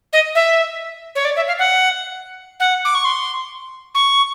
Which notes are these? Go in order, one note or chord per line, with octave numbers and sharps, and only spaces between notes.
D#5
E5
C#5
D5
E5
F5
F#5
F#5
D6
C#6
C6
C#6